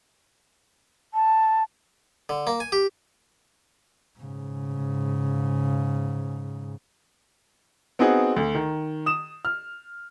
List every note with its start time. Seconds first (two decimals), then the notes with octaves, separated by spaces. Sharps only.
1.14 A5
2.29 D3
2.47 A#3
2.60 G#5
2.72 G4
4.20 G#2 C#3
7.99 B3 C4 D#4 F#4 G#4
8.36 D2
8.55 D#3
9.06 D#6 E7
9.45 F6